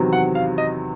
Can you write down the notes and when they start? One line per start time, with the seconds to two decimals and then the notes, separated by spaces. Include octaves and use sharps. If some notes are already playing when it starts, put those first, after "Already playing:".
Already playing: E2 C3 D#3 F#3
0.13 F#5
0.35 F5
0.58 D#5